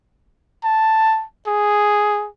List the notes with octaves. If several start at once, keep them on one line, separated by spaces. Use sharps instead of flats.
A5
G#4